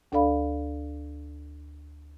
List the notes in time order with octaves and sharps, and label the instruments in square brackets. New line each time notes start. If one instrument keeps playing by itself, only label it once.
[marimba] D2 D4 A4 D5 F5 B5